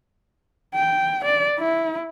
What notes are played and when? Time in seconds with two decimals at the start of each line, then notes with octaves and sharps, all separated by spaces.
0.75 G5
1.25 D5
1.59 E4